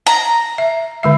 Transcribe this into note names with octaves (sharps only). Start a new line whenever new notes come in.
A#5
E5
D3 G#3 E5